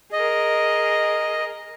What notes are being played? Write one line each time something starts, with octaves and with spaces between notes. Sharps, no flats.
G#4 A#4 D#5